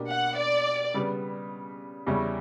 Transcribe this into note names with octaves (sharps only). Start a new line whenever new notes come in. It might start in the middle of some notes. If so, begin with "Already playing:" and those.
Already playing: B2 A#3 D4 G4
F#5
D5
C#3 G3 B3
E2 C#3 G3 C#4 E4